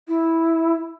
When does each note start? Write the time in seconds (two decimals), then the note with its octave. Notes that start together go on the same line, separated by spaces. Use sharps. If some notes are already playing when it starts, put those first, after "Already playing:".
0.08 E4